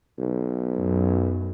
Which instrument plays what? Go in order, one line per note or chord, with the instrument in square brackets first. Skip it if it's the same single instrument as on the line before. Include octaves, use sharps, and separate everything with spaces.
[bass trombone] B1
[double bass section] F#2